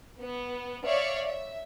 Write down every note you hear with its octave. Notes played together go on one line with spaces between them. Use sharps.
B3
C#5 D5 E5 F5
E5